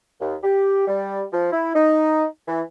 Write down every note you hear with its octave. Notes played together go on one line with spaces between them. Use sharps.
D#2
G4
G3
F3
E4
D#4
E3